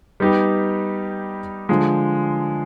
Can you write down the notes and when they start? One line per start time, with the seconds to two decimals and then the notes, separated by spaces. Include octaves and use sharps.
0.20 G3 B3 D#4 G4
1.69 D3 F3 G#3